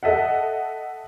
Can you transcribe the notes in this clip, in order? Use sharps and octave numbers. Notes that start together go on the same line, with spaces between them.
A4 D#5 E5 F#5